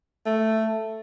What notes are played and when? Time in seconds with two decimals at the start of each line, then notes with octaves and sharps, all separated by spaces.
0.26 A3